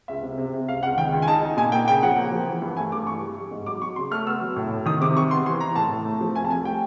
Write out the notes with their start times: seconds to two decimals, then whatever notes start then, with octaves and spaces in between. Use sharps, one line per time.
0.08 C#2 E5
0.23 C3
0.38 C3
0.53 C3
0.68 C#2 F5
0.83 C#2 F#5
0.98 D#3 G5
1.13 C#2
1.22 G#5
1.27 D#4 A5
1.43 D#4
1.57 A#2 G#5
1.72 A#3 G5
1.88 C#3 G5
2.03 F3 F#5
2.17 A#3
2.32 F3
2.47 E3
2.62 G2
2.77 A3 G#5
2.92 G2 D6
3.07 E3 C#6
3.21 G3
3.37 G3
3.51 G#2
3.66 F#3 D6
3.82 F#3 C#6
3.96 C#3 C6
4.11 A3 F6
4.26 B3 E6
4.41 F#3
4.56 A2
4.71 A2
4.86 D#3 D#6
5.01 C3 D6
5.16 G3 C#6
5.31 B3 C6
5.46 E3 C6
5.60 E3 A#5
5.76 A2 A5
5.91 A2
6.05 A3
6.21 F3
6.35 C2 G#5
6.45 A5
6.50 A3 G#5
6.65 G3 G5